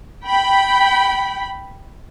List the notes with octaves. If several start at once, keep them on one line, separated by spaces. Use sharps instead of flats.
G5 B5